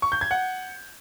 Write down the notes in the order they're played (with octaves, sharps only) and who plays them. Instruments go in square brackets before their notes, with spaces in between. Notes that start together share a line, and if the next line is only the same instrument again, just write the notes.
[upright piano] C#6
G6
G#6
F#5